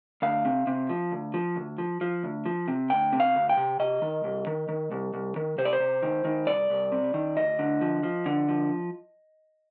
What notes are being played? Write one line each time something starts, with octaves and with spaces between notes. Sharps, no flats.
D2 F5
C3
C3
F3
D2
F3
D2
F3
F3
D2
F3
C3
D2 G5
C3
F5
D2
G5
C3
C3 D#5
D#3
C2
D#3
D#3
C2
C2
D#3
C3 C5
D5
C5
C3
D#3
D#3
C2 D5
C2
C3
D#3
D2 D#5
D3
F3
F3
D3
F3